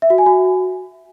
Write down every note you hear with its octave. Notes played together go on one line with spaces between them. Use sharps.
E5
F#4
G#5
F#4